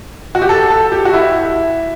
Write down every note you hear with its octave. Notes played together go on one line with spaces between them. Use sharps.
F#4
G4
A4
A4
G4
F#4
E4